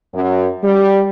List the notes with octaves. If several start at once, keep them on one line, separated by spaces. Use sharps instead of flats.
F#2
G3